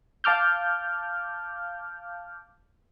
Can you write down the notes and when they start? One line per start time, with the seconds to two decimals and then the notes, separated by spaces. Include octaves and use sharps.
0.24 F5 A5 D6 F6 G6